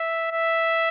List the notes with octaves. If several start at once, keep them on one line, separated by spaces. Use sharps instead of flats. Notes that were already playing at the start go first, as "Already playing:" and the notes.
Already playing: E5
E5